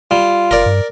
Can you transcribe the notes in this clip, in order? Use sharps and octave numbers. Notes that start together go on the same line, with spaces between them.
G3 F4
F#1 A#4 D5
G2